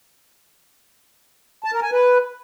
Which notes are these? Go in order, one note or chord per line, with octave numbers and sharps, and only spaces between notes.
A5
A#4
G#5
B4